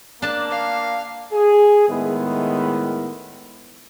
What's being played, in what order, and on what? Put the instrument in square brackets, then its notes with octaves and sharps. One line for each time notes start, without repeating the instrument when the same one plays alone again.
[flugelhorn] A#3 [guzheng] D4 A5
[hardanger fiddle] F5
[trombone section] G#4
A2 D#3 G#3 B3 E4